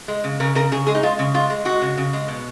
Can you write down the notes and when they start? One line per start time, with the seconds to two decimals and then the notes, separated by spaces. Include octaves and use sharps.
0.08 G#3
0.24 C#3
0.40 C#3 A#4
0.55 C#3 A#4
0.72 C#3 G#4
0.87 G#3 G#4
0.95 D#4
1.03 G#3 F4
1.19 C#3
1.34 G#3 F4
1.50 G#3
1.65 G#3 F#4
1.82 C#3
1.97 C#3
2.13 G#3
2.28 B2